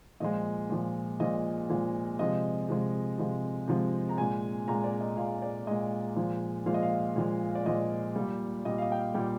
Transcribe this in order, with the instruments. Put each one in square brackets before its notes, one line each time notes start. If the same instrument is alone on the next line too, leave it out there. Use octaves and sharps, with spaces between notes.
[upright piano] A#2 F3 G#3 D#5
A#2 F3 G#3
A#2 F3 G#3 D#5
A#2 F3 G#3
C3 F3 G#3 D#5
C3 F3 G#3
C3 F3 G#3
C3 F3 G#3
A#5
A#2 G#3 G#5
A#2 G#3 A#5
D5
D#5
A#2 G#3 F5
D5
A#2 G#3 D#5
A#2 F3 G#3
A#2 F3 G#3 F5
D#5
F5
A#2 F3 G#3
D5
A#2 F3 G#3 D#5
A#2 G3
A#2 G3 D#5
F5
D#5
G5
F5
G3 G5
A#2